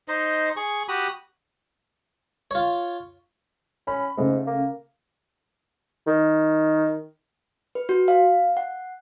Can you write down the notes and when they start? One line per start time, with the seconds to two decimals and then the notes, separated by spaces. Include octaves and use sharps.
0.08 D#4 C5 D#5
0.56 G#4 C#6
0.88 F#4 G4 B5 D#6
2.51 F4 C#5
3.87 C#4 B5
4.18 G#2 C#3 A3
4.47 A#3
6.07 D#3
7.75 B4
7.89 F#4
8.08 F5
8.57 F#5